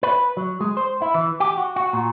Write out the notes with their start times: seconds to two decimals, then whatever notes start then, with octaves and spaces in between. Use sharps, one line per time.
0.03 B4
0.37 F#3
0.61 G#3
0.77 C5
1.02 E4
1.14 E3
1.40 G4
1.58 F#4
1.76 F#4
1.93 A#2